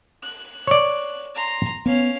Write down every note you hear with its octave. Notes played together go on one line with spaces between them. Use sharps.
F#6
C#5 D5
A#5 C6
B3 C#4 F5